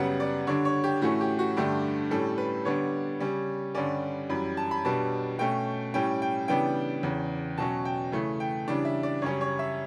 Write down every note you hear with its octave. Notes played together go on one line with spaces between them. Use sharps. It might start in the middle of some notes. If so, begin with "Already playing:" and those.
Already playing: F#2 C#3 G3 B3 F#5
D5
D3 G3 D4 C#5
C#5
G4
A2 E3 A3 C#4 F#4
G4
F#4
G2 D3 A3 D4 G4
A2 G3 C#4 A4
B4
D3 G3 B3 D4 C#5
C#3 G3 C#4
G2 D3 G3 C#4 D5
F#2 E3 G3 B5
A5
B5
B2 G3 B3 D4 A5
B2 A3 C#4 G5
A2 G3 C#4 G5
G5
C#3 E3 G3 B3 D4 G5
E2 C#3 E3
B2 F#3 C#4 A5
G5
C#3 E3 A3 C#4
G5
C#3 E3 G3 D4
E5
D5
F#2 C#3 G3 C#4 C#5
C#5
E5